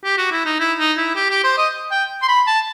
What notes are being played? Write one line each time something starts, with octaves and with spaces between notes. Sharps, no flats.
G4
F#4
E4
D#4
E4
D#4
E4
G4
G4
C5
D#5
G5
C6
B5
A5